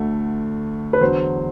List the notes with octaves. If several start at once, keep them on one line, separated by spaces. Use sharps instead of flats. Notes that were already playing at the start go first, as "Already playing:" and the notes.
Already playing: D2 D3 A3
B4
E2 D3 F#3 C5